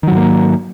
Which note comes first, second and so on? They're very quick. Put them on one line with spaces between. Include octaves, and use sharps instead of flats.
D#3 F#3 G#2 A#3